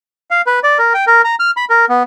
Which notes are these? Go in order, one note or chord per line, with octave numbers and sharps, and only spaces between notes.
F5
B4
D5
A#4
G5
A#4
A#5
F6
B5
A#4
B3